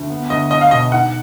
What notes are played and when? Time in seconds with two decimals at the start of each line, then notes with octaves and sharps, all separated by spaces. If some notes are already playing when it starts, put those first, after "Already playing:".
Already playing: D2
0.10 B3
0.30 D2 D#5
0.50 D4 D#5
0.61 F5
0.71 B2 D#5
0.92 D#4 F#5